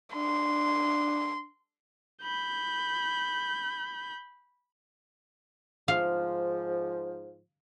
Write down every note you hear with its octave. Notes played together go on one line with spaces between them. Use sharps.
D4 C6
B5 G6
G#2 F3 F5